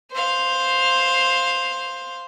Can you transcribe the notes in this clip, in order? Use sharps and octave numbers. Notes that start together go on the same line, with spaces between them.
C5 F5